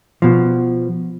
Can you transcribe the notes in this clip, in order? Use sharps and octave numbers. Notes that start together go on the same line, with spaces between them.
B2 F3